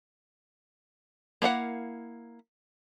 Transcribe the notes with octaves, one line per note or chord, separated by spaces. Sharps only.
A#3 E4 F5 F#5